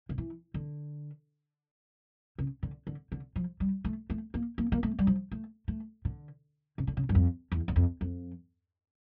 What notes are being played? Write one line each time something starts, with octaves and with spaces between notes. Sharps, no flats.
D3
E3
D3
C#3
D3
D3
D3
F3
G3
A3
A3
A#3
A#3
A#3
A3
G3
F3
A3
A3
D3
C#3
D3
C#3
G2
F2
E2
E2
F2
F2